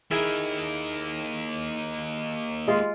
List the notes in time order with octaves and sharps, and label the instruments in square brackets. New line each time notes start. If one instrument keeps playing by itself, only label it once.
[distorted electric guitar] A#3 D#4 [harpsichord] E4 G#4
[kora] G#3 F4